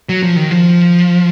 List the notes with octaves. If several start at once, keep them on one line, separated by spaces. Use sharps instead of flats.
F#3
F3
D#3
F3